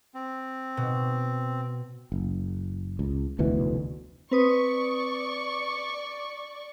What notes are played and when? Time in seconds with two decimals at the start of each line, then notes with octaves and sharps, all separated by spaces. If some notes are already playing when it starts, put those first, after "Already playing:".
0.15 C4
0.77 B2
2.12 F#1
2.99 C#2
3.39 F1 D2 B2 E3
4.31 C4 B4 D5 C#6 D#6